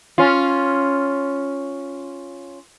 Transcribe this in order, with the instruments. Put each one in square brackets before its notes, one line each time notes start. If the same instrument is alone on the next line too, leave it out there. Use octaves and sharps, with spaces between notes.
[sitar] C#4 F4